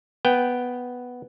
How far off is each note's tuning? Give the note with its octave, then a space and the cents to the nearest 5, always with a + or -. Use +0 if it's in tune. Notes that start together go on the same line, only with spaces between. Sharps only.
B3 +0 G5 +0